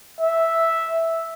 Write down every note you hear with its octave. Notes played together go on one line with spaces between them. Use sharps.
E5